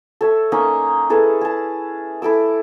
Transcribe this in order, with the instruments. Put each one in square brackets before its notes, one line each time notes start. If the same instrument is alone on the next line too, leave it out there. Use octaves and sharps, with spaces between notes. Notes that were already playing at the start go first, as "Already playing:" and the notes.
[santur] A4 C#5 E5
A#3 C#4 D#4 D#5
E4 G#4 A4 B4
G#4 A5
E4 A4 D6 E6